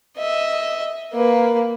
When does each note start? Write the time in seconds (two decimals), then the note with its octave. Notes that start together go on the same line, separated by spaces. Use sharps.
0.17 D#5 E5
1.14 A#3 B4